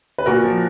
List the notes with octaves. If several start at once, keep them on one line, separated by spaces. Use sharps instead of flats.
B4
A#2 F#4 A#4
F3